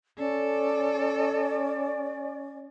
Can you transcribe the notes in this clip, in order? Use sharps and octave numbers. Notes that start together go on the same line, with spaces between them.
C#4 A4 D5